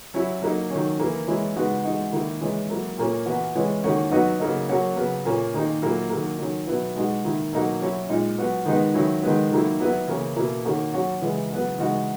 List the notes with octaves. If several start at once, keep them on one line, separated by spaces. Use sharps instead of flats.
F#3 C#4 E4
F#3 A#3 D#4
D#3 F#3 C#4
E3 A#3 E4
E3 G#3 C#4 E4
C#3 G#3 B3 D#4 F#4
E3 G#3 D#4 F#4
D#3 A#3 E4
E3 G#3 C#4 E4
F#3 A#3 E4
A#2 A#3 C#4
E3 B3 F#4
E3 G#3 C#4 E4
D#3 A#3 C#4 F#4
F#3 B3 D#4 F#4
C#3 F#3 A#3 D#4
F#3 A#3 C#4 F#4
C#3 F#3 B3
A#2 A#3 C#4
D#3 A#3 D#4
A#2 F#3 A#3 E4
D#3 F#3 A#3
D#3 F#3 C#4
B2 F#3 B3 E4
B2 G#3 D#4 F#4
D#3 A#3 E4
B2 F#3 A#3 D#4 F#4
F#3 C#4 E4
A#2 G#3 D#4
F#3 B3 F#4
D#3 G#3 B3 D#4
D#3 F#3 C#4 E4
D#3 G#3 B3
D#3 F#3 A#3 E4
F#3 B3 E4
C#3 E3 A#3 C#4
B2 A#3 E4
D#3 A#3 C#4 F#4
F#3 C#4 F#4
C#3 E3 G#3
C#3 F#3 B3
C#3 E3 G#3 D#4 F#4